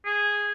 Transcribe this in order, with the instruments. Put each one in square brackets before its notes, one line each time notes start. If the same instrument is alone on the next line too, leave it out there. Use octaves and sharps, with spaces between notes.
[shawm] G#4